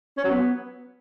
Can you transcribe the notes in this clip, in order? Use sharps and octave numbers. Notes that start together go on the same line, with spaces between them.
C#4
F#3
B3